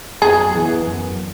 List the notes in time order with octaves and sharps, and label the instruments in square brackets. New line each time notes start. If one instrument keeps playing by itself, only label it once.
[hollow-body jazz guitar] F#2 [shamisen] G#4
[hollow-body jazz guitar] E3 B3
F#2